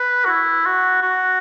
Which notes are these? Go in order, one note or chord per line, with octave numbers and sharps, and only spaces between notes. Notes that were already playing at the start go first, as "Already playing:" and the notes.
Already playing: B4
F#4
E4
F#4
F#4